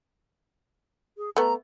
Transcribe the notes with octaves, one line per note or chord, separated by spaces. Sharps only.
G#4
A3 B3 A#5